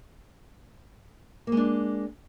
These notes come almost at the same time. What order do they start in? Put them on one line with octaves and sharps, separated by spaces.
A#3 G#3 D4